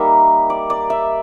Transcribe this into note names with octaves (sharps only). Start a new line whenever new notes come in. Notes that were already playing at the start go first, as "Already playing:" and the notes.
Already playing: G3 A#3 D#4 E5
D5
D5
E5